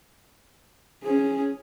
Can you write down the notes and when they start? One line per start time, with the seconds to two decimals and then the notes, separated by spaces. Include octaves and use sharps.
1.03 C#4 G#4